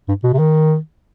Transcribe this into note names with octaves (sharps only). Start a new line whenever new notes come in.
G2
B2
C3
D#3